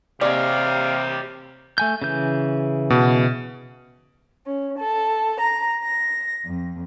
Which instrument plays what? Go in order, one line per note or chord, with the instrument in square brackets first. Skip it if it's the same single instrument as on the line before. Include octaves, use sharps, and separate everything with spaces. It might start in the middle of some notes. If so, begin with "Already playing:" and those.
[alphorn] C3 [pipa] G#3 D5 [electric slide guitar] G4 C#5 [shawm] F5
[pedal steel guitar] A3 G#5 G6
C#3 E3 G6
[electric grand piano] B2
[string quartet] C#4
A4
A#5
A#6
F2